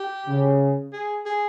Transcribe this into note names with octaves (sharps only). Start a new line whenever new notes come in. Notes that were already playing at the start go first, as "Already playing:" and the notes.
Already playing: G4
C#3
G#4
G#4